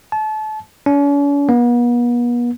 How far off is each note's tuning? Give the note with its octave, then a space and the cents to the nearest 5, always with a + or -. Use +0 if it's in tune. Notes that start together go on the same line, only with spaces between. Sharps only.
A5 -30
C#4 +45
B3 -40